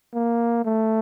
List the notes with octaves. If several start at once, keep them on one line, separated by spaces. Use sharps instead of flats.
A#3
A3